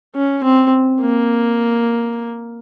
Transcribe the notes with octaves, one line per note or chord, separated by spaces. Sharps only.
C#4
C4
A#3